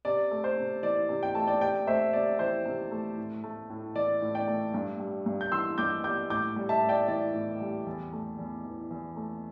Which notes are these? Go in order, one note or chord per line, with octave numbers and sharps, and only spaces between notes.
C3 D5
A3
C5
C3
E3 D5
C3
G5
A3 A5
D5 G5
C3 D5 G5
A3 C5 E5
C3 D5
E3 C5
C3
A3
A2
A3
A2
E3 D5
A2
D5 G5
A3
G2
G3
G2
G6
E3 C6 E6
G2 D6 G6
G3 D6 G6
A2 D6 G6
G3
E5 A5
A2
D5 G5
E3 D5
A2
G3
E2
A3
E2
E3
E2
A3